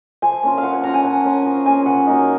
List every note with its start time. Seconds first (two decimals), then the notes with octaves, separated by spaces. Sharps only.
0.22 F3 G#5
0.43 A#3 C#4 F4
0.58 F5
0.63 F3 F#5
0.73 G#5
0.84 A#3 C#4 F4 A#5
0.94 G#5
1.04 F3 F#5
1.25 A#3 C#4 F4
1.46 F3
1.66 A#3 C#4 F4 G#5
1.86 C#3 F#5
2.07 F#3 A#3 D#4